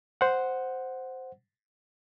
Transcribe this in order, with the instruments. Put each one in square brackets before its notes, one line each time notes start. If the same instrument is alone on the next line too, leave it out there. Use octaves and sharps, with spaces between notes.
[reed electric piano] C5 F#5